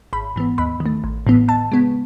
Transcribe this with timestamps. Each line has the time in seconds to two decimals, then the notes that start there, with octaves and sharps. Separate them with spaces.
0.13 G#1 B5
0.36 G#2 E3 B3
0.58 D#2 B5
0.80 D#3
0.86 A3
1.04 A1
1.27 A2 E3 B3
1.48 D#2 A5
1.71 C#3 G#3 B3